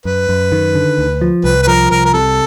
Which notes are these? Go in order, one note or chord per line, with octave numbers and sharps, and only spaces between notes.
F#2 B4
F#2
D#3
D3
D2
F3
C2 B4
B4
F3 A#4
C2 A#4
A#4
C3 A4